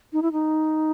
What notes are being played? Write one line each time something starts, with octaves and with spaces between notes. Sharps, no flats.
D#4
E4
D#4